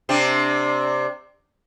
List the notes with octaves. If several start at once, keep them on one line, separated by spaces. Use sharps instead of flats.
C3 C4 D4